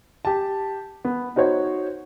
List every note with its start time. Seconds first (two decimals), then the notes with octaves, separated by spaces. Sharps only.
0.25 G4 A5
1.05 B3
1.36 D#4 F#4 C5 C#5